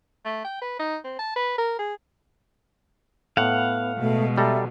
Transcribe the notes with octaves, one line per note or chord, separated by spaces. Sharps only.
A3
G5
B4
D#4
C4
A5
B4
A#4
G#4
A2 B3 F5 F#5
B2 G#3 A3
G3 A4 E5 A#5